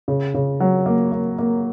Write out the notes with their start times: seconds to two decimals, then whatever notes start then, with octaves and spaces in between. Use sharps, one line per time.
0.08 C#3
0.34 C#3
0.60 F#3
0.86 A#3
1.12 A#3
1.38 A#3